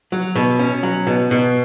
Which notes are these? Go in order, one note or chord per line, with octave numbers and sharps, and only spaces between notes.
F#3
B2
C#4
F#3
B2
B2